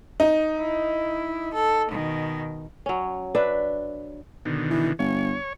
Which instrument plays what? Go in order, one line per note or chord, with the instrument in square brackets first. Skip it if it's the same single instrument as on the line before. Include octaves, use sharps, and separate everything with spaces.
[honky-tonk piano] D#4
[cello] E4
A4
B2 D#3
[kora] F#3 C#4
D4 B4 E5
[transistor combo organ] B2 D3 D#3
[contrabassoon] E3
[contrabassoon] G1 [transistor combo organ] C#5